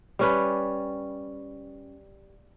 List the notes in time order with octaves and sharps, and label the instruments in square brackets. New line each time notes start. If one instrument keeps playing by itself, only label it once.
[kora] G3 C#4 B4